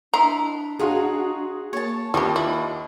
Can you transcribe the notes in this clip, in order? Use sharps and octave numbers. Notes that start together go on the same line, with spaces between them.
D4 E4 D#5 A#5 C6
D#4 F4 F#4 G#4 C#5
A#3 C#5 A5
D#2 G3 F4 G4 D#5 C#6
E4